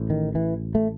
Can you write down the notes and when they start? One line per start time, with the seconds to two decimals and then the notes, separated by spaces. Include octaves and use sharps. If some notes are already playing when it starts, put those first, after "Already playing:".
Already playing: A1 A2
0.10 D#3
0.35 E3
0.75 A3